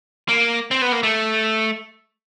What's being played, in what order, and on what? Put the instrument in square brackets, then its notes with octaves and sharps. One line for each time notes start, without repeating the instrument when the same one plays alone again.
[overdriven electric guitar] A#3
C4
B3
A#3
A3